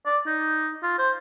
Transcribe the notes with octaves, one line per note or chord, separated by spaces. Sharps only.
D5
D#4
F4
C5